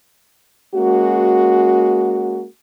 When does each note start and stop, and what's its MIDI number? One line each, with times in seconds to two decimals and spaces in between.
0.74 2.45 56
0.74 2.45 58
0.74 2.45 61
0.74 2.45 66